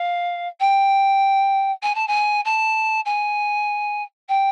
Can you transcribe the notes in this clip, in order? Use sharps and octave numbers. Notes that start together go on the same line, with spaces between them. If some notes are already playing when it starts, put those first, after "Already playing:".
Already playing: F5
G5
G#5
A5
G#5
A5
G#5
G5